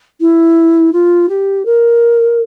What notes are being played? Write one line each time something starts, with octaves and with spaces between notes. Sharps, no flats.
E4
F4
G4
A#4